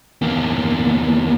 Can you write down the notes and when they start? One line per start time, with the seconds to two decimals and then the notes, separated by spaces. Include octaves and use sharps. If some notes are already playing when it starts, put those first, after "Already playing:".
0.22 E2 A#3